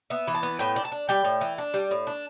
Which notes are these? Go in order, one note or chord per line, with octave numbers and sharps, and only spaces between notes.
B3 E5
E3
A5
B3
A2 G5
D4
A5
D4
G3 G5
A2
E3
D4
G3
A2
D4